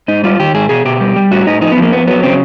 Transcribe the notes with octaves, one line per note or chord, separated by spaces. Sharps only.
G#2 D#4
G3 F4
D#3 G4
G#2 G#4
B2 G#4
B2 G4
G3
G3
A2 F#4
A2 D#4
F3 D#4
B3
F3
A#3
F2 B3
F#3 B3
C#3 C4